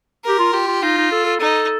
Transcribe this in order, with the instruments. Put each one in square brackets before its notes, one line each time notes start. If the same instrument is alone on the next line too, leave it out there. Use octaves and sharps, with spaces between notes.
[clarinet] G4 [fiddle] A#4
[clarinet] F4
[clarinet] F4 [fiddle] G4
[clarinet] F4
[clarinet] D#4 [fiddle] F4
[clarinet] D#4
A4
A4
[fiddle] D#4 [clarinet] A4